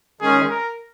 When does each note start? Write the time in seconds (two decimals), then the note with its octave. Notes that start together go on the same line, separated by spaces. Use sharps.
0.21 D#3 G#3 C#4 G#4
0.50 A#4